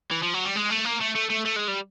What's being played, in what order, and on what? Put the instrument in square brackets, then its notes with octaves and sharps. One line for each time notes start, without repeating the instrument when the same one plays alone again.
[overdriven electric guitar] E3
F3
F#3
G3
G#3
A3
A#3
A3
A3
A3
A3
G#3
G3